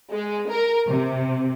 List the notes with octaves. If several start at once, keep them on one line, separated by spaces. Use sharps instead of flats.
G#3
A#4
C3